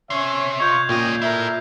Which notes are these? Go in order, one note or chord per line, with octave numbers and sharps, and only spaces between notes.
C3 C#4 C#5 E5 C7
F4 D#5 C#6 G6 G#6 F7
C#2 A#2 C#4 D#5 G5
E4 A4 A#4 E5